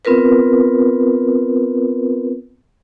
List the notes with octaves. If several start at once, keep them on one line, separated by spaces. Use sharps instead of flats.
B3 C4 F4 A#4 B4